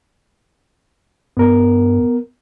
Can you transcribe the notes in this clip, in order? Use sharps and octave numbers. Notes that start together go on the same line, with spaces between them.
G2 B3 A#4